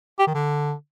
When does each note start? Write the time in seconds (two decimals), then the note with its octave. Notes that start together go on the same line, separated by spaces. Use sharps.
0.19 G4
0.27 D#3
0.34 D3